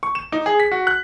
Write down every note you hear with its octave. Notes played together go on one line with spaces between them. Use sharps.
C#6
E7
D#4
G#4
B6
F#4
F#6